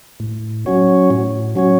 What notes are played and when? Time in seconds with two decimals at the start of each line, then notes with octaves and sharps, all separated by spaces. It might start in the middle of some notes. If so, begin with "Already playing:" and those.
0.20 A2
0.66 F#3 C#4 F#4 C#5
1.10 A2
1.56 F#3 C#4 F#4 C#5